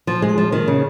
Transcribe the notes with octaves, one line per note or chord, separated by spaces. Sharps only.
F3
G#3
F3
D#3
C#3